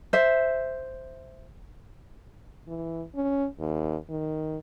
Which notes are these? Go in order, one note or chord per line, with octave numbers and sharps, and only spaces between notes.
C5 E5
E3
C#4
D#2
D#3